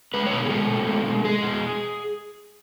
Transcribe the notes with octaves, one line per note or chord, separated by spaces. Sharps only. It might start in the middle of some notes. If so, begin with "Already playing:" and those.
G#3 B4
C#5
B2
G#4
G#3 A4
B2
G#3
G#3
G#3 G#4
B2